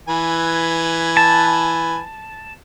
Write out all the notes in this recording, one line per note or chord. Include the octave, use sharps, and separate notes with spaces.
E3 B4 G#5
A5